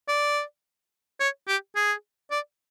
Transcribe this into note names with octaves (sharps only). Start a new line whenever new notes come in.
D5
C#5
G4
G#4
D5